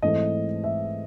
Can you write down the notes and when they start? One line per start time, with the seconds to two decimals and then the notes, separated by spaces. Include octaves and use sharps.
0.02 G#2 E3 A3 C4 D#5
0.64 E5